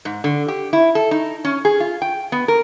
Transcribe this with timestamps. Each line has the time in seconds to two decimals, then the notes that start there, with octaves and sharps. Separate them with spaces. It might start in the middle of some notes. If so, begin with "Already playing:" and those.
0.05 G#2
0.24 D3
0.48 G4
0.73 E4
0.95 A4
1.11 D#4
1.45 C#4
1.65 G#4
1.80 F4
2.02 G5
2.32 B3
2.48 A#4